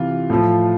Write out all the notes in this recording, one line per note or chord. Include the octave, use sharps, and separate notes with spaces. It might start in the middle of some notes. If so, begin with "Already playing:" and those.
Already playing: C3 E3 F4
A2 F3